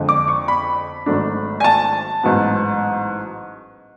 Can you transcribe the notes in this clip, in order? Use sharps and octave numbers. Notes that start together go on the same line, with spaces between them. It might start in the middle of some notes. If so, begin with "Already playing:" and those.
Already playing: F2 D3 G#3
D6
C#6
B5
G#1 G#2 F#3 A3 D4
G#5
A5
A1 G#2 F#3 B3